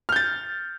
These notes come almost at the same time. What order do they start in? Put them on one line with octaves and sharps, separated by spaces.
F6 G6 A6